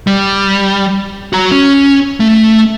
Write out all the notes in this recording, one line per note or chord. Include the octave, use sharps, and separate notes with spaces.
G3
F#4 A#5
C#4
A3